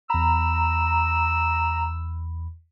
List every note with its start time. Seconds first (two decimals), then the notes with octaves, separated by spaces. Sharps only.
0.10 E2 A#5 B5 E6